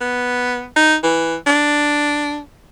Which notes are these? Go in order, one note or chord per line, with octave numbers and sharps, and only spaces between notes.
B3
D#4
E3
D4